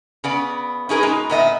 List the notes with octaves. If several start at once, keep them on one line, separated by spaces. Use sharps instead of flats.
C#3 B3 D5
C#4 D#4 G#4 A#4 B4
B2 G#3 D#4
A#2 B3 D#5 E5